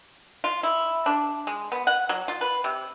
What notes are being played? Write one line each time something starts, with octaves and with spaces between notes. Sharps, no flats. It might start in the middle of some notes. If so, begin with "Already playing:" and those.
F4
E4
D4
G#3
B3
F#5
F#3
F4
B4
C3